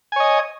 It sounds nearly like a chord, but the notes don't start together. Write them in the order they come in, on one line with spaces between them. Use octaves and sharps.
G#5 C#5 D#5